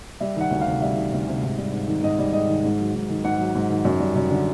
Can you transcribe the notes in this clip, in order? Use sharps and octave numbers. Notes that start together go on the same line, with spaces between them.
G3 E5
D#3 F#5
D2
F5
C3
G3 E5
D#3
D2
C3
G#2
G3
G#2
D#3
G#2 D#5
G3
G#2 D#5
D#3
G#2
F#3
G#2
D#3
G#2 F#5
F#3
G#2
D#3
F#2
G3
F#2
D3